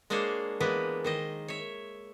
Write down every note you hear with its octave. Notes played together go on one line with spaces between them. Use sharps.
G#3 A#3 D4 G#4 C5 C#5
E3 G#3 A#3 B3 B4
D#3 C5 D#5
C#5 E5